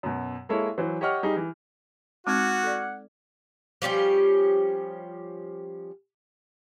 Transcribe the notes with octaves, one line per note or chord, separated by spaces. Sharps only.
F#2 B2
G#3 A#3 E4 A4 C#5
E3 F#3 C5
G4 C#5 D#5 F#5 C#6 F6
G3 D#4 G4 G#4
E3
G#3 C4 D#4 F#4 F#5 D6 F6 G#6
A4 D5
F3 G3 C#4 G4